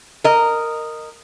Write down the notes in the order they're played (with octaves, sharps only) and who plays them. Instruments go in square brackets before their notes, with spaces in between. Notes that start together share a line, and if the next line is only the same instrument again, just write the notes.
[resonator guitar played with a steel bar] A#4 D#5